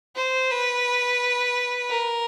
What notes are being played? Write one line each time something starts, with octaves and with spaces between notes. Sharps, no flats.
C5
B4
A#4